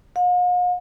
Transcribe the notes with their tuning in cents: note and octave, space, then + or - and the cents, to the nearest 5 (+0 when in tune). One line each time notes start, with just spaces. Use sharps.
F5 +45